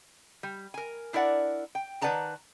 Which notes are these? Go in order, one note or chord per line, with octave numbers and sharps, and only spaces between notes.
G3
A#4 G#5
D4 E4 A#4 D5 F#5
G5
D#3 B4 D5 F#5 A5 A#5